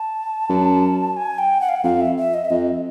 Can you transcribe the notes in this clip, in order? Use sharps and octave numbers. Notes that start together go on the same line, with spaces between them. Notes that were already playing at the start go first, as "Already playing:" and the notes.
Already playing: A5
F#2
G#5
G5
F#5
F5
F#5
F2 F5
E5
E5
D#5
E5
F2 D#5